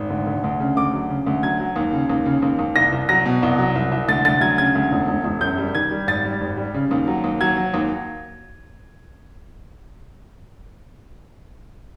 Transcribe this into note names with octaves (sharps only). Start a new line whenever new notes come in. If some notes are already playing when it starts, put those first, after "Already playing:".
Already playing: G#1
D2
D2
D2
C#3
D2 D6
F#3
C#3
D2
F#3 G#6
F#3
D#2
C#3
D#2
C#3
D#2
D#2
C2 A#6
C2
F#3 A#6
B2
C2
F#3
C2
C2
D2 A6
D2 A6
F#3 G#6
C#3 G#6
D2
E1
E1
E1
F#2 G6
G3
D#3 G#6
G3
G#1 A6
G3
G#1
G3
C#3
D#2
F#3
D#2
F#3 G#6
F#3
D#2